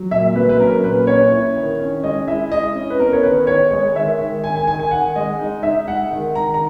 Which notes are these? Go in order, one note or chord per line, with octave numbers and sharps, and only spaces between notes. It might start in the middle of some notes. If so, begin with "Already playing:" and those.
Already playing: F#3
A#2 E5
F#3 B4
B4
C#4 A#4
A#2 B4
C#4 C#5
E4
D#3
C#4
G#3 D#5
E4 E5
E4 D#5
C#4
B4
B3 A#4
C#5
D#3 B4
D#3 C#5
G#3 C#5
D#3 E5
D#3
D#3 G#5
G#5
D#3 G#5
G#5
D#3 F#5
G#3 D#5
D#4
D#4 E5
G#3 F#5
D#3
D#3 A#5
A#5